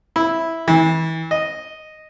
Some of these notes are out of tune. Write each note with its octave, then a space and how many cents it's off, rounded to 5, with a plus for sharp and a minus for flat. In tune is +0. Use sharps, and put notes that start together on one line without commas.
E4 -5
E3 -30
D#5 -5